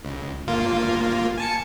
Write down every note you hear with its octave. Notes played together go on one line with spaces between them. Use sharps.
C#2
G1 A#3 F4
G#5 A5 C#7